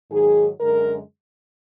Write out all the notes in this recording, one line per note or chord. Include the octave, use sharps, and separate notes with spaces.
G#2 D#3 F#3 G#4
F#2 D3 G#3 A#4